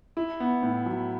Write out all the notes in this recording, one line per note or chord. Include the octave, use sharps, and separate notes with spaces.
E4
B3
A2
F#3